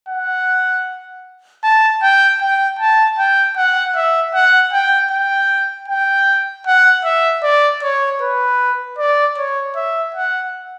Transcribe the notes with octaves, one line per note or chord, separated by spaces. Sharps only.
F#5
A5
G5
G5
A5
G5
F#5
E5
F#5
G5
G5
G5
F#5
E5
D5
C#5
B4
D5
C#5
E5
F#5